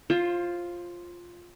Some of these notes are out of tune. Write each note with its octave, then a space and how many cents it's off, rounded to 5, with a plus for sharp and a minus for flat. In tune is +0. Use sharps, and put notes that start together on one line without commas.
F4 +0 C5 +25